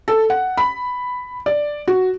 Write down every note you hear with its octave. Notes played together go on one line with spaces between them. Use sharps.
A4
F#5
B5
D5
F#4